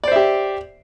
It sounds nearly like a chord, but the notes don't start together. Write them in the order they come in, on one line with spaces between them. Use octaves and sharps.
D5 C5 E5 G4